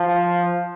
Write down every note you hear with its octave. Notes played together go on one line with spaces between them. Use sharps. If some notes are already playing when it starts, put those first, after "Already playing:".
Already playing: F3